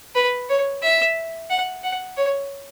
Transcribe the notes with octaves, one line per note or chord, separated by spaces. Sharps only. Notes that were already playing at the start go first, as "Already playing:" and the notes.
B4
C#5
E5
F#5
F#5
C#5